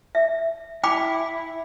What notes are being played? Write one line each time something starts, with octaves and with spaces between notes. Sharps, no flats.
E5
E4 G5 B5 D6